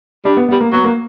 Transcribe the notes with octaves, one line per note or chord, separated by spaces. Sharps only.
G3 D4
B3
B3
G3
A#3
F#3 B3
A#3